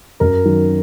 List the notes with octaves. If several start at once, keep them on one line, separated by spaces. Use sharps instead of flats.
F#2 A#4
D#3 F#3